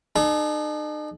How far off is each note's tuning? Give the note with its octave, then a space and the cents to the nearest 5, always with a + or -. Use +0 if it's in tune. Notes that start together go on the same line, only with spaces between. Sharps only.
D#4 -45 A4 -45